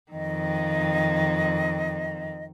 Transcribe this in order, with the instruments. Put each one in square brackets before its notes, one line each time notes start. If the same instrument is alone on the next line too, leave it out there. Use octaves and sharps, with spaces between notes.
[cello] F2 D#3 [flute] D#5